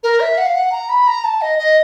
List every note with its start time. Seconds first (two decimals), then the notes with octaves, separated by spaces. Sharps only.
0.03 A#4
0.20 E5
0.38 F#5
0.46 F5
0.55 F#5
0.72 A#5
0.89 B5
1.07 A#5
1.24 A5
1.42 D#5
1.59 D#5